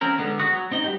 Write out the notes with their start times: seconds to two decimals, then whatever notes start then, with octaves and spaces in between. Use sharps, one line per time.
0.01 F3 C4 C#4 A#4
0.18 D3 G#3 B3
0.39 B3 F#4 D#6
0.53 F#3
0.71 C4 D#4 D#5
0.84 G3 A#3 B3 F#4 G4